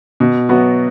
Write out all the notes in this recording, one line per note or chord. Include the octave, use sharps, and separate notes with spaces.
B2
F#3 B3 F#4